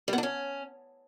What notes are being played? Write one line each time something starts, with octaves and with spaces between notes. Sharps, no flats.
G3
B3
D4
C#4